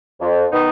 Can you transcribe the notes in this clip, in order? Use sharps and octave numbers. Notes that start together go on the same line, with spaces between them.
F2
D#3 B3 D#4